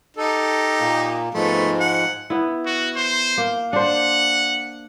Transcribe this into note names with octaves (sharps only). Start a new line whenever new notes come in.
D#4 G4 A4
A#2 A#3
G#2 F3 G#3 A3 B3
F#5
B3 E4
F#4
C5
A#3
D4 C5 F#5